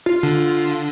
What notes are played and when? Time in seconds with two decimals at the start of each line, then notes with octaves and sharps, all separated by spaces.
0.06 F4
0.23 D3